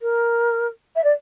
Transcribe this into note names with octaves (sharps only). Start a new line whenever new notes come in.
A#4
E5
D5